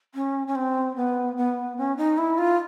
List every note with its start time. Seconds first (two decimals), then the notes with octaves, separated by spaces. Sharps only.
0.15 C#4
0.47 C#4
0.56 C4
0.96 B3
1.37 B3
1.78 C#4
1.97 D#4
2.18 E4
2.38 F4